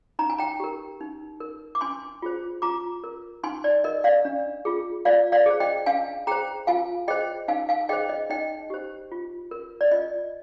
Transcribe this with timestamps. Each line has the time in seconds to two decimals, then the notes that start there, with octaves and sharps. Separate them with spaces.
0.19 D#4 A#5
0.30 G#5
0.38 G5 A#5
0.60 G4 A#4
1.01 D#4
1.40 A#4
1.75 D6
1.81 D4 G#5 C6
2.22 F4 G#4 C5
2.62 F4 A#5 D6
3.04 A#4
3.43 D#4 G#5 C6
3.64 D5
3.84 A#4 D#5
4.04 D5 F5
4.25 D4
4.65 F4 G#4
5.05 F4 D5 F5
5.32 D5 F5
5.46 G#4 C5
5.60 D#5 G5
5.86 D4 F5 G#5
6.27 G#4 C5 G5 A#5
6.67 F4 F5 G#5
7.08 G#4 C5 D#5 G5
7.48 D#4 F5 G#5
7.69 F5 G#5
7.89 G#4 C5 D#5 G5
8.09 D#5
8.30 D#4 D#5 G5
8.70 G4 C5
9.12 F4
9.51 A#4
9.81 D5
9.91 F4 D#5